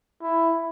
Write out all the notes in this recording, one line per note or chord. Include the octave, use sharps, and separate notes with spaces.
E4